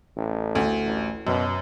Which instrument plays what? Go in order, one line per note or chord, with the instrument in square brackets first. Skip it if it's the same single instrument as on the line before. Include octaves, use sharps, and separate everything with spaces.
[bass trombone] A1
[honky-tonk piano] D2
[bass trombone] A1
[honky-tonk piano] F#2 [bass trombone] B2